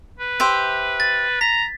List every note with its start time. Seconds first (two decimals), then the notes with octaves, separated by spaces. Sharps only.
0.19 B4
0.40 G4 C5 E5
1.00 A6
1.41 A#5 B6